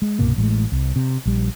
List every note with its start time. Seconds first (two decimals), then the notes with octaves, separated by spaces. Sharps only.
0.02 G#3
0.19 C2 G2 B2 A#3
0.36 A1 A2 G#3
0.72 C2
0.96 C3
1.26 A#1 G3